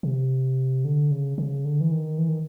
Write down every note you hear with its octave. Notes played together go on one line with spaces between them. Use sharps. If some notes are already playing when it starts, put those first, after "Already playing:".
C3
D3
C#3
C#3
D3
E3
D#3
E3
D#3